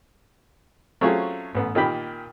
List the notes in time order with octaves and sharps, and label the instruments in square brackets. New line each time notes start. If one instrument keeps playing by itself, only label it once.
[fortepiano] F#3 A3 C4 C#4 F4 G#4
A1 B3
A#2 D#3 A#3 G4 B5